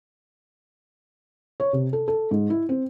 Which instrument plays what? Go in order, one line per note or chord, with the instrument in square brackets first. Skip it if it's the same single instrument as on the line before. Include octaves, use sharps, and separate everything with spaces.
[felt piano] C#5
C3
A4
A4
G#2
E4
C4